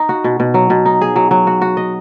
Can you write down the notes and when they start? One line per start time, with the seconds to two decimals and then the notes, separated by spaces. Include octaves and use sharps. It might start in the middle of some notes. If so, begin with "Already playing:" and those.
Already playing: D#4
0.09 F#4
0.24 B2
0.40 B2
0.54 F#3
0.70 B2
0.86 D#4
1.01 G#4
1.16 F#3
1.31 F#3
1.47 F#4
1.62 F#4
1.77 D#5